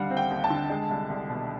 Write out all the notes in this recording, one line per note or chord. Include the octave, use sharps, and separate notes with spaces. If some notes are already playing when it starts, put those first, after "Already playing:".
Already playing: D#2 D3 G3 F5 F#5
C4
G5
D#2
A5
D3
G#3
C2
C2
B2